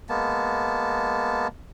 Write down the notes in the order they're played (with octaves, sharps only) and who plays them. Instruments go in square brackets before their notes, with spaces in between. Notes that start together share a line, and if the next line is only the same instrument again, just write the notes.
[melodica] G#3 A#3 B3 A5